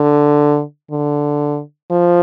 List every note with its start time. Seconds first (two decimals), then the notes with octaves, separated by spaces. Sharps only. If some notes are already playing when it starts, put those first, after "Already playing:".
Already playing: D3
0.91 D3
1.91 F3